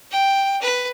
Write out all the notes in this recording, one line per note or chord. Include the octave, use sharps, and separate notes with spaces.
G5
B4